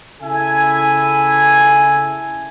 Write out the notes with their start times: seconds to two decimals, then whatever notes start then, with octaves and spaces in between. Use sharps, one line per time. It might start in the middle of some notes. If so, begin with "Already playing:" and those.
0.22 C#3 E4 A4 E5 G#5